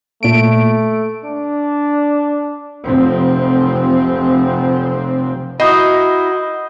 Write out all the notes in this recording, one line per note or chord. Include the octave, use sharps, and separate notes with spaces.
A#2 A3 D7
D4
F1 F3 C4
E4 F#4 A#4 D#5 D#6 G6 C7